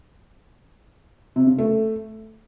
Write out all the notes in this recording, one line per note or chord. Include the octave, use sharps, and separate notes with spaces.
C3
C#3
A3